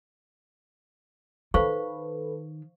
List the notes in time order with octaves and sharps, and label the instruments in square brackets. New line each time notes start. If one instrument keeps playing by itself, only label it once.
[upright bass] D#3 [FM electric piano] A4 B4 [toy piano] C5 F5 C#6